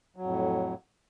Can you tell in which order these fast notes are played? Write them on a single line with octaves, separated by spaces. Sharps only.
F#3 F2 A2